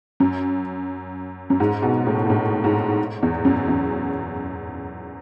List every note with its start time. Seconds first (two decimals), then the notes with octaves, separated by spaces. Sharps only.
0.20 F#2
1.50 F#2
1.60 G#2
1.82 B2
2.07 A2
2.26 G#2
2.30 A2
2.64 G#2
3.23 E2
3.45 F#2
3.68 E2